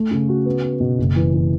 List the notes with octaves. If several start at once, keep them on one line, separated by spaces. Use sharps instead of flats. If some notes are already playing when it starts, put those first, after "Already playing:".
Already playing: A3
C#3
F#4
B3
B3
B2
F#1
E3
E3